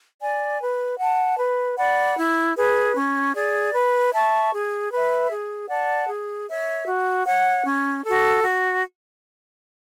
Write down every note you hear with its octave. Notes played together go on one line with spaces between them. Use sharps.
D5 G#5
B4
F#5 A5
B4
D5 F#5 B5
E4
G#4 B4
C#4
G#4 D5
B4
E5 A5 C#6
G#4
B4
E5
G#4
D5 F#5 A5
G#4
C#5 E5
F#4
C#5 F#5
C#4
F#4 A4
F#4